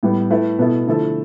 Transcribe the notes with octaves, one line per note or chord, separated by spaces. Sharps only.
A2 G3 B3
A3 E4 B4
B2 B3 E4 A4
D3 F3 A3 E4 A4